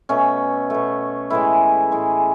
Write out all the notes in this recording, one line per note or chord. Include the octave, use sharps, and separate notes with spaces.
B2 A3 C#4
B2 A3
A2 E3 G#3 E4
A2 E3 G#3